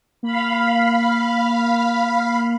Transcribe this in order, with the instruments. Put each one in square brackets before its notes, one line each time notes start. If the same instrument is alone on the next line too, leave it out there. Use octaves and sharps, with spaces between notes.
[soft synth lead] A#3 [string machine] F5 B5